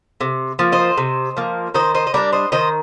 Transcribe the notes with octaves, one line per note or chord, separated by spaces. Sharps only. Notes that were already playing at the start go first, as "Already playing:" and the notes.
C3
F3 A#3
C5 D#5
C3
F3 A#3
D#3 C5 D#5
C5 D#5
D#5
G3 D4 A#4 D5
C5 D#5
D#3 C5 D#5